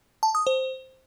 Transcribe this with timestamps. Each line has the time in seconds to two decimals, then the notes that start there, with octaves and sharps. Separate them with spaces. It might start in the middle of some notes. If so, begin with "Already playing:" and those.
0.23 A5
0.35 D#6
0.47 C5